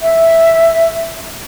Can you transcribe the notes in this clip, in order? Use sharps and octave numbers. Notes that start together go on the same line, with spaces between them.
E5